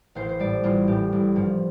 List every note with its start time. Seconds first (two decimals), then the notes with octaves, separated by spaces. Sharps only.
0.15 A1 C5 F5
0.29 C5
0.39 A2 G3 A4 D5
0.64 A1 F4
0.87 A2 G3 G4
1.12 A1
1.36 G2 F3